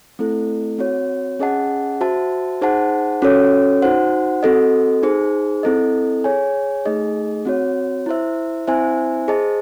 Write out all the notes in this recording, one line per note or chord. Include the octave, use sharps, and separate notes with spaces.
A3 C4 E4 A4
C4 F#4 C#5
C#4 G#4 D#5 F#5 A5
F#4 C5 E5 A5
D#4 G#4 C5 F#5 A5
C#4 F#4 A4 C#5
D#4 F#4 C5 F#5
C4 F#4 A4 D#5
D#4 G#4 C5
C4 E4 A4 D#5
G#4 C#5 G#5
A3 D#4 G#4 D#5
C4 F#4 C#5
E4 C5 E5
C4 E4 C5 E5 G#5
G#4 C5 D#5 A5